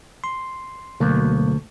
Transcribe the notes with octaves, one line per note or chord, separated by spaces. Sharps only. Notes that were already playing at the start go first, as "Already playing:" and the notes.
C6
D2 B2 F#3 A#3